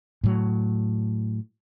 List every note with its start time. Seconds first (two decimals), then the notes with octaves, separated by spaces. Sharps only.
0.24 A2 F#3